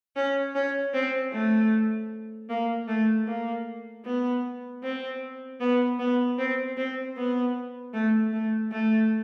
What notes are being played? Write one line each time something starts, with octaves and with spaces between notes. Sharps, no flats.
C#4
C#4
C4
A3
A#3
A3
A#3
B3
C4
B3
B3
C4
C4
B3
A3
A3
A3